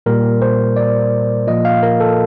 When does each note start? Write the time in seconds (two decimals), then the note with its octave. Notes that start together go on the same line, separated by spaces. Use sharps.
0.06 A#2 G3 A#3 A#4
0.42 C5
0.76 D5
1.47 A#2 F3 A#3 F4 D#5
1.65 F5
1.83 A#4
2.00 A4